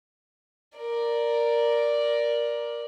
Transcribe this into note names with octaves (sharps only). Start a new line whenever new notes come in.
A#4 D5